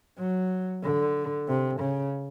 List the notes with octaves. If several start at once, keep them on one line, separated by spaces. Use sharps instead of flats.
F#3
D3
C3
C#3